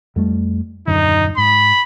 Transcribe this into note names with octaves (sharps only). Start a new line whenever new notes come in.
F2 G3 A3
D#1 F#2 D3 D#4
G#2 B5